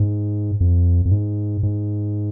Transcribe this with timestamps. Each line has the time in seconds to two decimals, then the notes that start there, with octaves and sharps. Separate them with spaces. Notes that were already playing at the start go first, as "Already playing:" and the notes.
Already playing: G#2
0.60 F2
1.05 F2
1.11 G#2
1.63 G#2